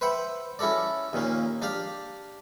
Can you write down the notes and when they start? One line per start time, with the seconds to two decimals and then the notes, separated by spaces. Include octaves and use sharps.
0.01 B4 C5 E5 F#5 G5
0.59 C#4 E4 F#4 A4 D5
1.13 D#2 A#2 A#3 C#4
1.62 D4 G4 D5 F5